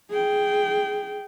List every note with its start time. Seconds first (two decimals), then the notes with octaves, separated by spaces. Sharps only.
0.10 G#4 G5